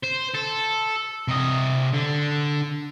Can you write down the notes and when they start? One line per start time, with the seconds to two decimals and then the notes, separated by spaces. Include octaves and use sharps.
0.04 C5
0.35 A4
1.28 C3 D#5
1.94 D3